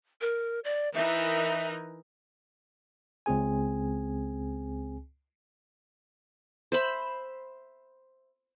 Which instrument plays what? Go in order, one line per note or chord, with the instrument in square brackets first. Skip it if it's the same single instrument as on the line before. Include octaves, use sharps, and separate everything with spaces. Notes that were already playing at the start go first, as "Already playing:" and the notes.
[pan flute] A#4
D5
[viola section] E3 D#4 A#4 [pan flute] E5
[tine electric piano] C#2 C4 G#4 G#5
[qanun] C5 E5 B5